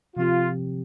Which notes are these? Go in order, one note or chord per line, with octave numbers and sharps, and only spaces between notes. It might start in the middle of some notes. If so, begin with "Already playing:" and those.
C3 F3 C4 F4 G4